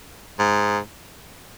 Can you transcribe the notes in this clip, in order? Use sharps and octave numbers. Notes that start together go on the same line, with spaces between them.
G#2